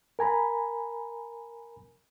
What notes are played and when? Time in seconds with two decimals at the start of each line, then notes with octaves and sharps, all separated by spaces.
0.19 A#4 G#5 A#5 B5